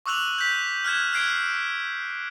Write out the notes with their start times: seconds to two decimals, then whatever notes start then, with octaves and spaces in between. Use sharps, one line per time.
0.06 C#6 D6 E6 F#6 F7 F#7
0.38 G6 B6
0.85 F6 F#6 G#6 E7
1.13 F6 F#6 G#6 C7 D7